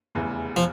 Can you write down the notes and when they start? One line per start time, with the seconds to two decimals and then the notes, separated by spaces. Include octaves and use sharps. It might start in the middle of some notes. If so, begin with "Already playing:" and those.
0.15 F1 E2 C#3 E3
0.56 F3